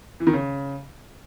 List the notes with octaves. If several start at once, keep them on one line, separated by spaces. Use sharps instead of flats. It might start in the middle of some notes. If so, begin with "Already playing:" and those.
E3
D#3
C#3